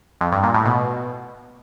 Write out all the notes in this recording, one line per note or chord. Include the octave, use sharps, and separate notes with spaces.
F2
G2
A#2
A2
B2